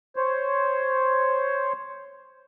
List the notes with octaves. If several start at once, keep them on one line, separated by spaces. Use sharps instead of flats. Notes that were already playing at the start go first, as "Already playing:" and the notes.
C5 C#5